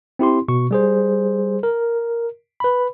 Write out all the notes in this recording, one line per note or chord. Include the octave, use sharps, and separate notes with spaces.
C4 E4 G4 C6
B2 C#6
G3 G#4 C5
A#4
B4 B5